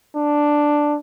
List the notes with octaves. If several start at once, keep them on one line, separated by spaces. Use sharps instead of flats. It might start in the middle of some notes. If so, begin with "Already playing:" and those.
D4